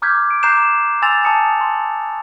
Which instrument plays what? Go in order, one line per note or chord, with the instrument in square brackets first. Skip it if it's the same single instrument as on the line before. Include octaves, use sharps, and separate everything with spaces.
[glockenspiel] A#5 D6 F6 G6 G#6 B6
D7
A#5 D6 F#6 G6 C7 E7
G#5 C6 E6 A6 E7 F7
A5 A#5 D#6 C#7
C6